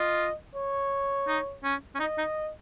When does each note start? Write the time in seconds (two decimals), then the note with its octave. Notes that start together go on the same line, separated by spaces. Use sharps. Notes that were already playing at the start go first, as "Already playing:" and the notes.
Already playing: F4 D#5
0.56 C#5
1.28 D#4
1.64 C#4
1.95 C#4
2.00 D#4 D#5
2.18 D#4